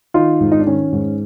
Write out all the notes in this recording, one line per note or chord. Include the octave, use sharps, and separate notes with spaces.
D#3 D#4 F4
G#2
D#4
D4
D#3 C#4
G#2